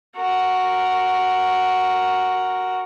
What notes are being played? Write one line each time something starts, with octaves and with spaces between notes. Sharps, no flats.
F#4 A#4